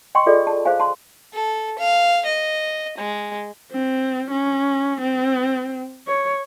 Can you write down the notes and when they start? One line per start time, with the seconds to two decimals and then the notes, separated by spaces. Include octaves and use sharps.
0.15 D#5 G5 G#5 C6 C#6
0.26 F4 G#4 A4 D5 D#5
0.47 A5
0.65 G#4 C5 F5 G#5
0.80 A5 C6
1.34 A4
1.79 F5
2.26 D#5
2.98 G#3
3.72 C4
4.30 C#4
5.01 C4
6.08 C#5